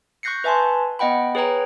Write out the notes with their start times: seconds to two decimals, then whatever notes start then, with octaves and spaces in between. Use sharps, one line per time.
0.23 C#6 F#6 G6 A#6 C7 C#7
0.44 B4 E5 G#5 A5 C6
0.99 B3 D#5 F#5 G5 B5
1.35 G#4 B4 C#5 G5 A#5